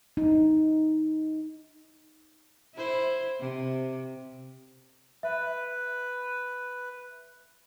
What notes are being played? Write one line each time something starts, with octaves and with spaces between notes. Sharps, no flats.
D#4
E4 C5
C3
B4 E5